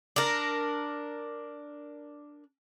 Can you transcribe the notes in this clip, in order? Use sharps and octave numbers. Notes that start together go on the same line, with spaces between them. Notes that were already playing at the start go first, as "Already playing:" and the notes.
D4 A#4